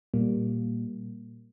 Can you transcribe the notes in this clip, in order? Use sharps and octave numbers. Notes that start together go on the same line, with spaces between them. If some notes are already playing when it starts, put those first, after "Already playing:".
A#2 G3 A#3